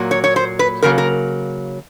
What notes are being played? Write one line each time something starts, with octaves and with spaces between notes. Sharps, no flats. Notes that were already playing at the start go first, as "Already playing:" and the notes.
Already playing: A#2 F#3 A#3
C#5
C#5
C5
B4
C#3 F#3 A#3 A#4
A#4